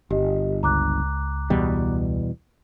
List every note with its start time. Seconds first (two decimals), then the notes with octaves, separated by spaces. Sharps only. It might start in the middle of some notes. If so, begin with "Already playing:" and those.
0.10 G1 G4 D#5
0.63 C#2 A#5 D6 F#6
1.50 E2 B2 G3